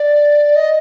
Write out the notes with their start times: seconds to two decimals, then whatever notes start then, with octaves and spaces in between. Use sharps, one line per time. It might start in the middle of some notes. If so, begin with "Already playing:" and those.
Already playing: D5
0.56 D#5